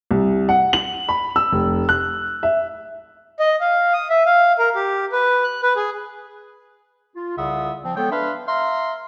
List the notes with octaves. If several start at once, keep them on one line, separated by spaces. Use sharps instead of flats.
C2
F#5
F#7
B5
E6
F1
F#6
E5
D#5
F5
D#6
E5
F5
A#4
G4
B4
F#6
B4
G#4
F4
C2 C#3 F4 E5 F#5 D#6
F3 C4
G#3 B3 A4 C#5 G5
D4 B4 E5 F5 B5 C6
E5 F5 A#5 C6